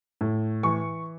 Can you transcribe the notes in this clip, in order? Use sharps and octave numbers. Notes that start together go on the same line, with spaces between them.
A2
E3 C#6